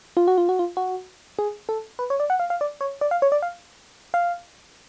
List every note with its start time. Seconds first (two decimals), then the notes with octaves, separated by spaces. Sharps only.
0.17 F4
0.28 F#4
0.38 F4
0.49 F#4
0.59 F4
0.77 F#4
1.39 G#4
1.69 A4
1.99 B4
2.10 C#5
2.20 D5
2.30 F#5
2.40 F5
2.50 F5
2.61 D5
2.81 C#5
3.01 D5
3.11 F5
3.22 C#5
3.32 D5
3.42 F5
4.14 F5